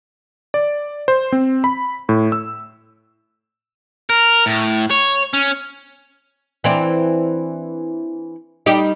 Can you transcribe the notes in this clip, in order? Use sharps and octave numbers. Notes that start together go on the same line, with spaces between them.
D5
C5
C4
B5
A2
E6
A#4
A2
C#5
C#4
E3 C4 D4
G3 D#4 G4